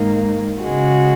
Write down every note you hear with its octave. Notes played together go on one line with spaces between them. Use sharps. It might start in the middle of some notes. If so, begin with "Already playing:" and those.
Already playing: G#2 D#3 A#3
C#3 G#3 F#4